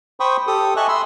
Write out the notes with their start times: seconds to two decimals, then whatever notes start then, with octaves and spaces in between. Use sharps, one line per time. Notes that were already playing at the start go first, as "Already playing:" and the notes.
0.20 C5 G5 B5 C#6 D#6
0.47 G4 A4 D#6
0.77 D#5 E5 G#5 A5 C#6 F#6
0.88 B5 C6 E6